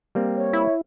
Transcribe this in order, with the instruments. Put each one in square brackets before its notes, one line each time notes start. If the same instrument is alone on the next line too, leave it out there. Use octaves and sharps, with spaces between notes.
[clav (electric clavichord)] G3 A#3 C4
[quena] C#5
[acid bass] E4